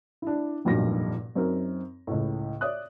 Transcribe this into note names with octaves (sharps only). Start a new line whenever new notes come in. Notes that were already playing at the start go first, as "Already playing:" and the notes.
D4 E4
F1 B1 G2 A#2 D#4 A#6
F#2 C4 D#4 A#4
C#2 A2
C#5 D5 E5 D#6 F#6